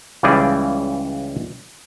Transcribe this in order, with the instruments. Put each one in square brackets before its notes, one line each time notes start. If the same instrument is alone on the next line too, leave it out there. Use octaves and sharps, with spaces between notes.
[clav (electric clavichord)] C#2 C#3 E3 G3 G#4 D5